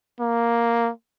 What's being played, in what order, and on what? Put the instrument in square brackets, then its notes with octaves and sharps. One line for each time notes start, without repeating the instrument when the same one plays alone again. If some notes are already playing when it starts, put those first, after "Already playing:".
[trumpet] A#3